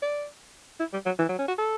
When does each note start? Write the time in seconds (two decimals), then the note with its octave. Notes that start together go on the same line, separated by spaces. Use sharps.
0.02 D5
0.80 E4
0.93 G3
1.06 F#3
1.19 E3
1.29 F#3
1.39 C#4
1.48 F#4
1.58 A4